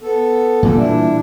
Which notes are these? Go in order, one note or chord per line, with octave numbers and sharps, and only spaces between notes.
B3 A4
A#2 E3 G3 A4
D4 E4